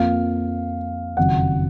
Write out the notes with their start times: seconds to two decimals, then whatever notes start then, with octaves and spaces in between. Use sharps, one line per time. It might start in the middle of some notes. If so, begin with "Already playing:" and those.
Already playing: F2 F3 A#3 F5
1.17 F#1 F2 D#3 F#3 F#5